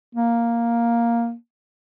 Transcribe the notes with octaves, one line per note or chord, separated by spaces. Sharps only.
A#3